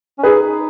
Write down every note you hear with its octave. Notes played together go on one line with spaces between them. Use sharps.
C#4
D#4 G#4 B4